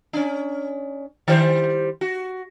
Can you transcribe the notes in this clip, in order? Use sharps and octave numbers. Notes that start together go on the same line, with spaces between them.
C#4 D4
D#3 G3 C5
F#4